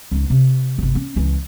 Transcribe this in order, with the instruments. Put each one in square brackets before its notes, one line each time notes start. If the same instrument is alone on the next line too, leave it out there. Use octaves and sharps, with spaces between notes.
[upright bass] C#2 D#4
C3
G1 C3
C#4
C#2 E3